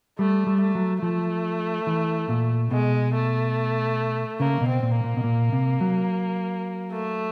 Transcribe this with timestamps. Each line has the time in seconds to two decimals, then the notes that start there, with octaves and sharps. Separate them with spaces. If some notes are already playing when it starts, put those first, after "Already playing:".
0.18 G3 A3
0.47 G3
0.60 A3
0.75 F#3
1.03 F3 A3
1.87 E3
2.29 A#2
2.71 B2 G#3
3.14 A3
4.40 C#3 A#3
4.61 B2
4.68 C4
4.83 A#2
4.96 A#3
5.04 A#2
5.17 B2
5.24 A#2
5.52 C3
5.81 F#3
6.93 A3